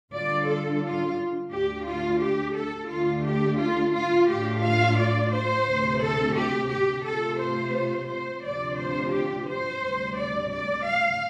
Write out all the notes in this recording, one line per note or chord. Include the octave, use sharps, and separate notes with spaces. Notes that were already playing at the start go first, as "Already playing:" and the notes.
D3 G3 D4 F4 D5
A4
F4
D2 D3 A3 D4 G4
F4
G4
A4
D2 D3 A3 D4 F4
G4
F4
F4
A2 A3 D4 F4 G4
F5
D5
C5
D2 C3 A3
A4
G4
G4
C3 A3 F4 A4
C5
C5
D2 C3 F3 D4 F4 D5
C5
G4
C5
D2 C3 G3
D5
D5
F5